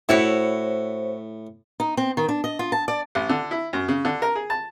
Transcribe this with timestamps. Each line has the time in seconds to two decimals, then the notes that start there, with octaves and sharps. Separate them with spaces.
0.09 A2 E4 F#4 C5 C#5
1.80 D#4
1.97 C4
2.17 D#3
2.29 D4
2.44 D#5
2.59 F4
2.72 A5
2.88 D5
3.15 A1
3.29 D3
3.51 E4
3.73 F#2
3.88 C#3
4.05 D3
4.22 A#4
4.35 G#4
4.50 A5